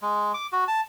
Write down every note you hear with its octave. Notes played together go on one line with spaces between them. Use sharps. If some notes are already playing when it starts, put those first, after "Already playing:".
G#3
D6
F#4
A5